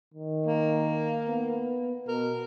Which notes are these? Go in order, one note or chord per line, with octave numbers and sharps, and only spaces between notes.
D#3
A#3
B3
B2 A#4